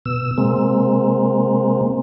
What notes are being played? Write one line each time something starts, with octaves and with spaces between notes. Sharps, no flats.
B2 E6
C3 G#3 A#3 C4